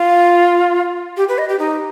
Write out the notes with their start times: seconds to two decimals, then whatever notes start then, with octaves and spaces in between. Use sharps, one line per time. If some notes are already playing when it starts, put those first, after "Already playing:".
Already playing: F4
1.17 G4
1.29 B4
1.38 D#5
1.49 G4
1.59 D#4